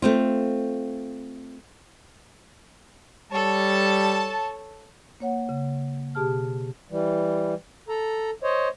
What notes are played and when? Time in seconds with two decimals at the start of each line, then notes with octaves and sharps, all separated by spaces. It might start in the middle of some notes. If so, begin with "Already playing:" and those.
0.02 A3 C4 F4
3.32 G3 A4 C#5 A5
5.20 A#3 C#5 F#5
5.49 C#3
6.15 B2 G4 G#4 A5 F6
6.90 E3 G3
7.89 A4 A#5
8.43 C5 C#5 D#5